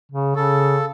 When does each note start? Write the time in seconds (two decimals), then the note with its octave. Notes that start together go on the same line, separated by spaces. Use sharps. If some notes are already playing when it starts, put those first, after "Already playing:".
0.12 C#3
0.36 C#3 A4